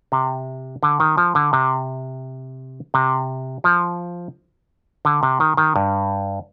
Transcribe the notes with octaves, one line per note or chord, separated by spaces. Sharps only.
C3
D3
D#3
F3
D3
C3
C3
F3
D3
C3
D#3
D#3
G2